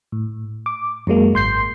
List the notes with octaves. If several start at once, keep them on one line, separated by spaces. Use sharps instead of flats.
A2
D6
F#2 F#3 G#3 A#3
G#1 C6 G6 C7